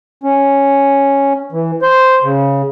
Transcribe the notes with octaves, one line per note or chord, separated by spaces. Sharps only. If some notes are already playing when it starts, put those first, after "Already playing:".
C#4
E3
C5
C#3